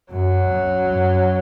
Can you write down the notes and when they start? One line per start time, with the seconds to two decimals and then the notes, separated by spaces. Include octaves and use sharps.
0.12 F#2 F#3
0.51 F#2
0.90 F#2